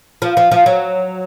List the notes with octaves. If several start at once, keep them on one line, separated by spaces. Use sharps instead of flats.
F3
F3
F3
F#3